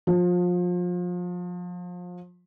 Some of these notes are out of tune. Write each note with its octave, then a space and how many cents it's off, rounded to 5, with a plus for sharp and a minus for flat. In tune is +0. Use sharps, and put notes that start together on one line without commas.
F3 +30